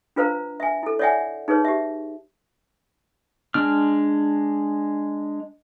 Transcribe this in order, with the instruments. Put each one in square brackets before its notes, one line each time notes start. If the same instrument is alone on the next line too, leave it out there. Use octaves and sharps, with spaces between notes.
[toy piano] D4 F4 B4 C5 F5 A#5
E5 G#5
E4 A4
C#5 D5 E5 F#5 G#5
D#4 G#4 B4 C#5
G4 E5
[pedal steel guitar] G#3 D4 F6